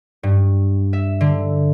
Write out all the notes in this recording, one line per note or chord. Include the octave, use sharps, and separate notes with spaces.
G2
E5
D3